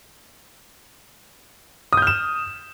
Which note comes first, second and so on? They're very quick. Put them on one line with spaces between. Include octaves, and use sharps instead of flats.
D#6 G6 F6 E7